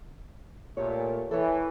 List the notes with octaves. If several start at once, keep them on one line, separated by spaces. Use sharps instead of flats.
A#2 A3 G4 C#5
E3 A4 C#5